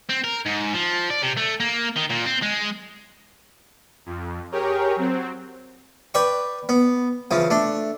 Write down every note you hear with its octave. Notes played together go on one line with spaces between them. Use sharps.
C4
A#4
G#2
F3
D5
C3
A3
A#3
D#3
A#2
C4
G#3
F2
G4 G#4 A#4 C#5 G5
F#3 C4
B4 D5 G5 C#6
B3
C#3 E3 F3
A3 D4